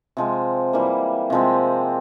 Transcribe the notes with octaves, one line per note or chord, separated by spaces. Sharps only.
C3 F3 G#3
E3 G3 A#3
C3 F3 G#3 C4